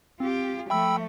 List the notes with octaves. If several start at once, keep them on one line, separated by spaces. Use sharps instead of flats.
C4 F4 G4
F3 A3 E5 G5 B5 E6